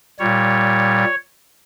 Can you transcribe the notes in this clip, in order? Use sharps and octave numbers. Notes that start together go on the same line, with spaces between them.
A#2 G3 C#5